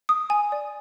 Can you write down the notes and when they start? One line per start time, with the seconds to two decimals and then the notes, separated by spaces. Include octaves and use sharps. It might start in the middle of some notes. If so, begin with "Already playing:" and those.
0.09 D#6
0.30 G#5
0.52 D5